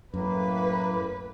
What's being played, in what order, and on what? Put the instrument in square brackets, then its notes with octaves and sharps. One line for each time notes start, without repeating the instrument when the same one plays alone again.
[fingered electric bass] F#2 [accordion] A2 A#3 [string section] B4